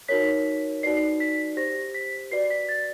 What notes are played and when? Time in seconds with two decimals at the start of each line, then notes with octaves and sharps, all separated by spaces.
0.08 D#4 F#4 A#4 C#5 B6
0.83 D#4 F#4 B4 D5 C7
1.20 B6
1.57 G4 C5 A#6
1.94 B6
2.31 F#4 B4 D5 C7
2.50 B6
2.69 A6